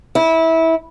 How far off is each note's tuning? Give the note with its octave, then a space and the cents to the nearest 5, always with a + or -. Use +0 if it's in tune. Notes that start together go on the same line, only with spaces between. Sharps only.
E4 -20